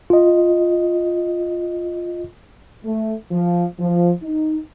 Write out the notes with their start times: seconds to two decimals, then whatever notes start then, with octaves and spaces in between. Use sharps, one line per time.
0.10 F4 D#5
2.84 A3
3.31 F3
3.79 F3
4.22 D#4